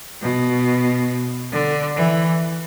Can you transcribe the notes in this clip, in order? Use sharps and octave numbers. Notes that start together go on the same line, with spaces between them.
B2
D3
E3